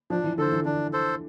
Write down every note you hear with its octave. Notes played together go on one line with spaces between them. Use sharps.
F3 D4
E3
D3 A4 C5
E3
D3 D4
A4 C5